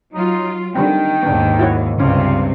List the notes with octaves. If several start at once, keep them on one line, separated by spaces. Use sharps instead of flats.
F#3 D#4 F4
D3 D#3 G3 C4 G5
D#2 G#2 B3 D4
E4 F#4 C#5
C#2 G2 C3 C4 C#4 F4